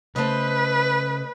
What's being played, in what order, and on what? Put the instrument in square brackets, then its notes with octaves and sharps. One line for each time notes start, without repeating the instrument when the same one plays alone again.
[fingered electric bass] C#3 [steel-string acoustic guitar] A3 C5 D#5 [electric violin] B4